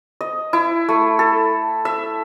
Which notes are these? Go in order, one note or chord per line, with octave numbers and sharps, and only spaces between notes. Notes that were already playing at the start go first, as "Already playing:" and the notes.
D#5
E4
A3
A4
E5